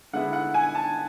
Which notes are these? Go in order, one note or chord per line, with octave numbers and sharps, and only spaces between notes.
D3 G#3 B3 E4 F#5
F#5
G#5
A5